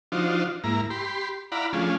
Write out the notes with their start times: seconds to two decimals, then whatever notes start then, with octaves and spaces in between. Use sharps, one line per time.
0.12 F3 D4 D#4 F4 F#4 C5
0.64 G#2 A#3 E4 A#5
0.90 G4 B5 C6
1.52 E4 D5 F5 F#5 A#5 B5
1.73 F3 A3 C#4 D4 F4 G#4